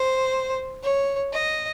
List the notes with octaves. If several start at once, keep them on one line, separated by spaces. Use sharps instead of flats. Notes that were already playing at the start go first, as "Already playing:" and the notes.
Already playing: C5
C#5
D#5